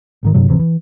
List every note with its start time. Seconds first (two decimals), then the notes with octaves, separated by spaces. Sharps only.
0.23 G#1 G#2 D#3
0.34 B1 G2 C3 F#3
0.48 D1 B1 C3 E3
0.59 E3